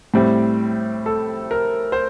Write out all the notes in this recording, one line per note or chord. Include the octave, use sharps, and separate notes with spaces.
A2 G3 C4
A4
A#4
C5